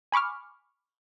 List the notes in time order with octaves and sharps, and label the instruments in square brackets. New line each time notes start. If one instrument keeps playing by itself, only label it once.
[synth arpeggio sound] G#5 B5 C#6 D6 F6